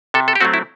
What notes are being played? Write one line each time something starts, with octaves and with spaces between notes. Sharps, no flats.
C3 A4
A4
G4
F#3 A3 C4 F#4
E4